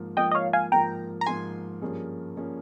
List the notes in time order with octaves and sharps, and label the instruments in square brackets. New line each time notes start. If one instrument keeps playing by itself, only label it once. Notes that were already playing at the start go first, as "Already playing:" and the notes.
Already playing: [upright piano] G#2 F3 A#3
[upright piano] G#2 F3 A#3 [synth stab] D#5 G5
[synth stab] D#5
C#5 F5
F5 G#5
[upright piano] G#2 F3 A#3 [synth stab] G5 A#5
[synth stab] A#5
[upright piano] G#2 F3 A#3 [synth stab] G#5 C6
[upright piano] G2 F3 A#3 C#4 G#4
F3 A#3 C#4 G#4